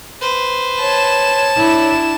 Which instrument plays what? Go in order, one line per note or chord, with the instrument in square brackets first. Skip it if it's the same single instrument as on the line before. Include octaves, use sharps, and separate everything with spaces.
[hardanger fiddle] B4 C5
[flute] C#5 [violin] A5 E7
[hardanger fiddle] D4 [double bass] E4